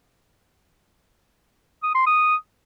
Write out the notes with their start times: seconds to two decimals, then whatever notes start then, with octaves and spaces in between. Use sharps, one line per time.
1.83 D#6
1.95 C6
2.06 D#6